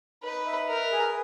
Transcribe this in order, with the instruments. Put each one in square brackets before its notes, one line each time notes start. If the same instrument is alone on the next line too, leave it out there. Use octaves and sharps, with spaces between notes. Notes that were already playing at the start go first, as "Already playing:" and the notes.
[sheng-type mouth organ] D#4 [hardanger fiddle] B4
[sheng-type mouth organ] E5
[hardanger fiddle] A#4 [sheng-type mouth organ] B4
[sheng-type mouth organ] G#4